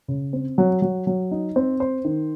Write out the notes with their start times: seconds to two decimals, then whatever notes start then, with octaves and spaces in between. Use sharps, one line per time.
0.08 C#3
0.33 C4
0.58 F#3
0.82 F#3
1.07 F#3
1.31 D#4
1.56 C4
1.80 C5
2.05 D#3